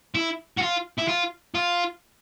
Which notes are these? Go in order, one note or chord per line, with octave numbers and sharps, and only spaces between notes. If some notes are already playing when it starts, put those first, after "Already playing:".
E4
F#4
F4
E4
F4
F4